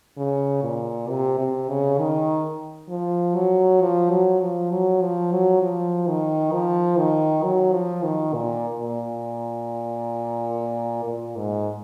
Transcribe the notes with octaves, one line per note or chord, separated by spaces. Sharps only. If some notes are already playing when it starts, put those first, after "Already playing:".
C#3
A#2
C3
C3
C#3
D#3
F3
F#3
F3
F#3
F3
F#3
F3
F#3
F3
D#3
F3
D#3
F#3
F3
D#3
A#2
A#2
A#2
G#2